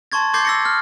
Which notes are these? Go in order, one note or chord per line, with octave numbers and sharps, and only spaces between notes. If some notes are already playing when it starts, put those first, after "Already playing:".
A5 C6 C#6 G#6 A6
C6 D6 G6 A6 C7
E6 A6 A#6 C7 C#7
F6